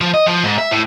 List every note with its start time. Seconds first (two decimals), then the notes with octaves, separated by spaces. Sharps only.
0.01 F3
0.14 D#5
0.26 F3
0.44 G#2
0.58 E5
0.72 A2